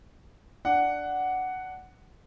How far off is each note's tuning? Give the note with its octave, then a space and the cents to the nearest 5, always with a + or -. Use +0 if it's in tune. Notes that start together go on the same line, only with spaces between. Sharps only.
D4 +0 F#5 +5